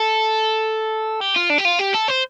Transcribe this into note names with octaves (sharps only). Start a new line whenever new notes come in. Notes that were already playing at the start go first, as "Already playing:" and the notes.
Already playing: A4
G4
F4
D4
G4
F4
G4
A4
C5